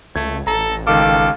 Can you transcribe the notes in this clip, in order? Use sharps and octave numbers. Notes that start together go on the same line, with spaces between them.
C#2 A3 G#6
A1 A4 A#5
C#2 D#3 A4 F5 D6